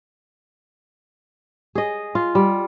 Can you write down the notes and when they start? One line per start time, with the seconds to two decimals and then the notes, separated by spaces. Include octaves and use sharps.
1.75 G#4 D#5
2.15 F4
2.35 G3